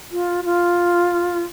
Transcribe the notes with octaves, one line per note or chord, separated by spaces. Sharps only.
F4
F4